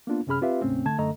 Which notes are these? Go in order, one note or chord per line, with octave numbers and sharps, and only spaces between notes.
A#3 B3 D4 F4
F#2 C3 C#4 G#4 B5 F6
C4 F4 G4 B4 E5 F5
D2 G#2 C3 A3 C4 C#4
D3 A3 A5 G#6
F#2 D3 A3 A4 D#5 A#5